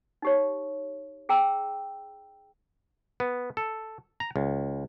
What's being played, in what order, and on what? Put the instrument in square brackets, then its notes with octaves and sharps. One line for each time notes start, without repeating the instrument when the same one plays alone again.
[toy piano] D#4 G4 C#5
G#4 G5 A#5 E6
[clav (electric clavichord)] B3
A4
A#5
C#2